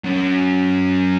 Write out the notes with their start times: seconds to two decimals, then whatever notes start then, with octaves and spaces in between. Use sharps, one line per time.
0.04 F#3 C#4